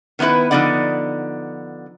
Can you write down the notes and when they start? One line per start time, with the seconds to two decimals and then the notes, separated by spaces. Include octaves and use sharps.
0.19 D#3 B3 D#4 E4 B4
0.51 D3 F3 B3 D#4 D5 F#5